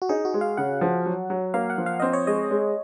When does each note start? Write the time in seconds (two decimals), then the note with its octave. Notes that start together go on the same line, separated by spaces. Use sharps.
0.02 F#4
0.09 D#4 G#4
0.25 F#4
0.34 G#3
0.41 F5
0.57 C#3 F#5
0.81 F3
1.06 F#3
1.30 F#3
1.54 A#3 F5
1.70 F#5
1.78 F3
1.86 F5
2.00 C4 D#5
2.13 C#5
2.27 G#3 D#5
2.51 G#3